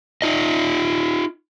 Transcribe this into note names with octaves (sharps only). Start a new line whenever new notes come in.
D#4 F4 D#5